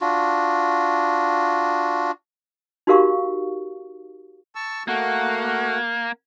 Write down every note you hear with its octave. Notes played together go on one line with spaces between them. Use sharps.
D4 F4 F#4
D#4 F#4 G4 A#4 F5 C#6
A5 C#6 E6
A3 A#3 F#4 F#5